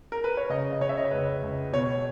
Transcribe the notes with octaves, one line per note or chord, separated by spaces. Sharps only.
A#4
B4
C#5
C#3 D#5
D#5
C#3 C#5
E5
D#5
C#5
C#2 B4
C#2
B2 C#5